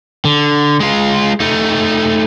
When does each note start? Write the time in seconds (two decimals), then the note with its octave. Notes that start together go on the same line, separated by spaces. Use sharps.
0.25 D3
0.80 G#3 F4
1.40 A3 D#4